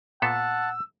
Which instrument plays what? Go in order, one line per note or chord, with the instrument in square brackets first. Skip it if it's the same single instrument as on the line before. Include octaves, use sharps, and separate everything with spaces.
[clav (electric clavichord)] A#2 B3 A4 [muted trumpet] F#5 [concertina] A5 [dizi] E6